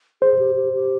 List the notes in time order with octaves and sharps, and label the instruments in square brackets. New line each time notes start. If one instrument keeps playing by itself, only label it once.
[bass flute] G#4 [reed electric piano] C5
[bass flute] G4
G4
G4